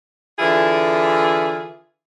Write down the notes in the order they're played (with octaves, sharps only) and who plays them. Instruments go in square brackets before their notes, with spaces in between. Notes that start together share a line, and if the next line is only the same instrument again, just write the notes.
[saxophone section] D3 E3 E4 F4 G#4